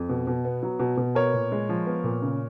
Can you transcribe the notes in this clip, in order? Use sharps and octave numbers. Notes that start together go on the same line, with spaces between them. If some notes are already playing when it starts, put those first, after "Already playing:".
Already playing: F2
B2
B2
B3
F#3
B2
B2
B3 A#4 C#5
A#2
G#3
F3
B3
A#2
C#3